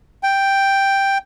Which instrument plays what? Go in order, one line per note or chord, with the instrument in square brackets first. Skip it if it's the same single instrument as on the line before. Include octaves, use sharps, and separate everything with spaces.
[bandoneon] G5